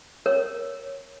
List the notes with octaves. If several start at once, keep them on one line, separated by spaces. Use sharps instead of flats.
A#4 C#5